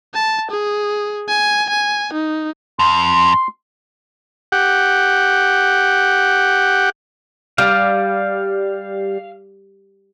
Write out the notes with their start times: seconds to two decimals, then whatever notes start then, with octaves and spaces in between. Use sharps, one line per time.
0.14 A5
0.51 G#4
1.28 G#5
1.69 G#5
2.13 D#4
2.79 F2 C6
4.52 G4 F#5
7.58 G3 F5